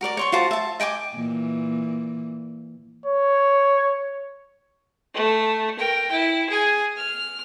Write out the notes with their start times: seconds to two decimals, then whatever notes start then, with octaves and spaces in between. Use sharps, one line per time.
0.01 F#4 A#4 D5 D6
0.17 C#5 C6 C#6
0.32 F4 F#4 C5 A5
0.51 E5 A5
0.80 D#5 G5 G#5 D6
1.14 A#2 E3
3.06 C#5
5.14 A3
5.78 A#4 G5
6.12 E4
6.49 G#4 G#5
6.96 F6